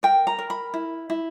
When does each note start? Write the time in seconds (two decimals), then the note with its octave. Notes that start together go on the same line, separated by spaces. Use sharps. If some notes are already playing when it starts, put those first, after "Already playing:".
0.03 A#4 G5
0.27 A#5
0.39 A#4
0.50 B5
0.74 E4
1.10 E4